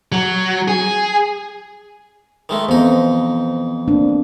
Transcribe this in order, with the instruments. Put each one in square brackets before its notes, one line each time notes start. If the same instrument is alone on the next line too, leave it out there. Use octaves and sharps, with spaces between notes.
[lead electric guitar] F#3
G#4
[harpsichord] D#3 G#3 A3
[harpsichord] F2 D#4 [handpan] E3 B3 C5
[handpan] A#3 C4 D4